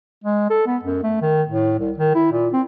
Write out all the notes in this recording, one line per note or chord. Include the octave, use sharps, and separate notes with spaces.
G#3
A4
B3
F#2
A3
D#3
A2
C2
D#3
E4
A#2
C4